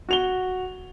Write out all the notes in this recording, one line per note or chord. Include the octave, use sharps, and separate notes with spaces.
F#4 F7 G7